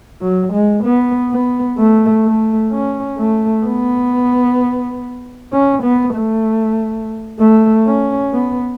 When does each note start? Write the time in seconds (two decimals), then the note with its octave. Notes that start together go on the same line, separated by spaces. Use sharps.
0.22 F#3
0.53 G#3
0.84 B3
1.31 B3
1.78 A3
2.25 A3
2.72 C#4
3.18 A3
3.65 B3
5.53 C#4
5.83 B3
6.14 A3
7.39 A3
7.86 C#4
8.33 B3